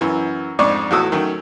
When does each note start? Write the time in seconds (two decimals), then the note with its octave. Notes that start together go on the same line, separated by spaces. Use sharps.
0.01 F#2 E3
0.59 F2 G#2 D4 D#4 D5 C#6
0.91 E2 A2 F#4 A4 D#6 E6
1.12 D#3 F#3 A3 C#4